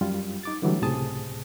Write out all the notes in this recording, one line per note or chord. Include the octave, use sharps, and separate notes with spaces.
F#2 G3 F4
D#4 D6 A6
D3 E3 F#3 G3 A3
C#2 A2 C3 G#4 A5 D#6